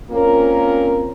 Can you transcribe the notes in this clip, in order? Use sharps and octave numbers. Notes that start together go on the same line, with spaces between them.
A#3 C4 C#4 F4 A#4